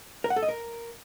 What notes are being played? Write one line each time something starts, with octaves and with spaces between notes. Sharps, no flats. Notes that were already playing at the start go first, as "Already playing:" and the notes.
A#4
F#5
A4
D#5
A#4